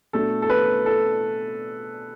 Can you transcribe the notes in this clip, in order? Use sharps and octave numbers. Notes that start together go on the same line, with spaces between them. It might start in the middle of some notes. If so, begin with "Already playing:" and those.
B2 A3 D4 A4
A4
B4
A4